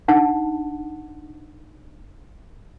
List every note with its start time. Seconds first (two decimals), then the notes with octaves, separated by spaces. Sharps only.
0.08 D4 D#4 F#5 A5